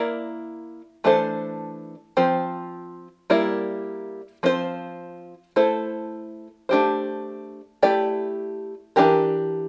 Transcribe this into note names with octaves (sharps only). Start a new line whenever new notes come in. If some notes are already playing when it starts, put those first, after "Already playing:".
Already playing: A#3 E4 A#4 D5
E3 A3 D4 A4 C5
F3 C4 F4 C5
G3 A#3 E4 A#4 D5
F3 C4 F4 A4 C5
A3 E4 A4 C5
A3 D4 G4 C5
A3 E4 G4 D5
E3 A3 D4 G4 A#4